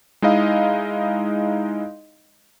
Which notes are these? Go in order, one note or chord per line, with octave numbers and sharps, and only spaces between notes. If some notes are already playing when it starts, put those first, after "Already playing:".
G#3 D#4 E4 D#5 F5